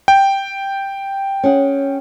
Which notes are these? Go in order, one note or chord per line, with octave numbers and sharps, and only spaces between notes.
G5
C#4 G#4 F#5